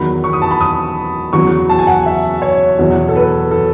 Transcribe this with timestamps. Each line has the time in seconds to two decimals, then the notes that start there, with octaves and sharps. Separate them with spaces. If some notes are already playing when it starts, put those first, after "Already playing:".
Already playing: E2 D#3 F#3 B5
0.24 C#6
0.33 D#6
0.42 A5
0.51 B5
0.60 D#6
1.33 E2 C#3 F#3 C#6
1.69 A5
1.79 G#5
1.87 F#5
2.06 E5
2.42 C#5
2.78 E2 B2 F#3
3.09 A4
3.16 B4
3.51 A4